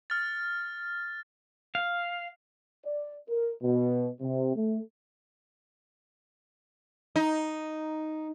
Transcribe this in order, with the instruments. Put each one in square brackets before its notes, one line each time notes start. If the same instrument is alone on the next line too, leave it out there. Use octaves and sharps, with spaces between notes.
[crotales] F6 A6
[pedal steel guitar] F5
[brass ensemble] D5
A#4
B2
C3
A3
[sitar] D#4